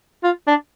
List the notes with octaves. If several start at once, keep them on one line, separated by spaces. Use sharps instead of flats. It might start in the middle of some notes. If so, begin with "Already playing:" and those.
F4
D4